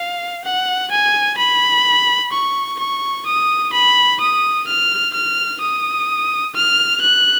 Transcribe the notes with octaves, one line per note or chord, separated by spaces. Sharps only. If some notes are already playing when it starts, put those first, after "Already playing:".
Already playing: F5
F#5
G#5
B5
C#6
C#6
D#6
B5
D#6
F6
F6
D#6
F6
F#6